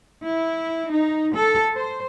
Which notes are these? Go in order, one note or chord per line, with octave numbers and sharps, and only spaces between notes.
E4
D#4
A4
C5